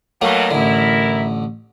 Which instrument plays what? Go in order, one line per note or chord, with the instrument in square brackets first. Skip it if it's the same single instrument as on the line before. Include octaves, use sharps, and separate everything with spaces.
[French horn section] B2 D#3 [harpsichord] F#3 A3 A#3
[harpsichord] A1 D3 [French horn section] E4 A#4